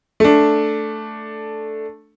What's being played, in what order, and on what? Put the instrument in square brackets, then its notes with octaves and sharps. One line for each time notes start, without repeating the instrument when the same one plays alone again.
[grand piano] A3 D4